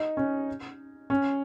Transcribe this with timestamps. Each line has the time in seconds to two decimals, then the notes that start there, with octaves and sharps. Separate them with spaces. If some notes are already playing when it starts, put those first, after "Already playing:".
Already playing: D#4
0.17 C#4
1.10 C#4